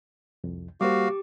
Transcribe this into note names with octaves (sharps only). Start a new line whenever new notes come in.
C2 F2
G3 A#3 F#4 G4 C5 F5 D6